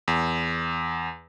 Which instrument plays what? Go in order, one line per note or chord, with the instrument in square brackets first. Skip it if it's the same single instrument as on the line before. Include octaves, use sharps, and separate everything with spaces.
[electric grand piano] E2